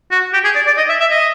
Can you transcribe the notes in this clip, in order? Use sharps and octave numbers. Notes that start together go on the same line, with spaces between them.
F#4
G4
G#4
D5
D5
D#5
E5
E5
D#5